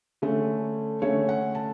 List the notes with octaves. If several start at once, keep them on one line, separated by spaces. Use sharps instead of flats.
D3 A3 C#4
D3 A3 C#4 C#5
F#5
A5